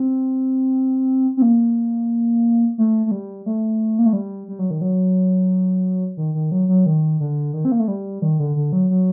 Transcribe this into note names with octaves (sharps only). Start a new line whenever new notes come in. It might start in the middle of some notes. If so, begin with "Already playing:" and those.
Already playing: C4
C4
A#3
A3
A3
G3
A3
A#3
A3
G3
G3
F#3
D#3
F#3
D#3
D#3
F#3
F#3
D#3
D3
D#3
C4
A#3
A3
G3
D#3
D3
D3
F#3
F#3